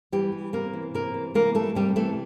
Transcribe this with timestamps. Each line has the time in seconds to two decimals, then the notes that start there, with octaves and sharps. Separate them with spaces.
0.12 E3 G3 G4
0.32 G3
0.53 C3 A#3 A#4
0.73 E3
0.94 C3 A#3 A#4
1.14 E3
1.34 E3 A#3 A#4
1.55 G3 A3 A4
1.75 C3 G3 G4
1.96 E3 A3 A4